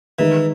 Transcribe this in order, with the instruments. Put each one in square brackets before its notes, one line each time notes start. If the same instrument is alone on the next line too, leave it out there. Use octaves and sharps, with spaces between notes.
[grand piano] D#3 G#3 D#4 [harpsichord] E3